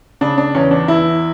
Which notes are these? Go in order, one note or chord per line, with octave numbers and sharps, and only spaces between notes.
C#3 D4
D4
E2 C#4
D4
E2 E4